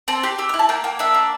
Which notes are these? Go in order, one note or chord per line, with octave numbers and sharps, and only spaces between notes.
C4 A5
G4 C6
G4 E6
F6
E4
A5
A#3 G5
A#3 G5
D4 E5
A#3